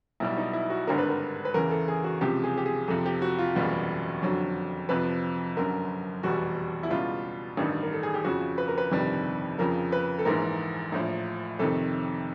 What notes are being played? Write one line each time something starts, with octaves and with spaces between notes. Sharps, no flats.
B1 B2 G3 E4
D#4
E4
F#4
G#1 G2 D3 G3 A#4
B4
A#4
B4
E2 C#3 E3 A#4
A4
G#4
F#4
C#2 C3 F3 G4
G#4
G4
G#4
F2 C3 F3 A4
G4
F#4
F4
F#1 E2 B2 G3
F2 D3 F#3
F2 C3 F3 B4
G1 F#2 D3 A#4
F1 E2 B2 G3 F#4
E4
C#2 B2 G3 F4
A1 G2 D#3 G3
A#4
A4
G#4
G4
F2 C#3 F3 F#4
B4
A#4
B4
G1 F2 C3 D#3 G3
F2 C#3 F3 A#4
B4
A4
A#1 G#2 E3 A#4
A#1 A2 F3
F2 C3 D#3 A4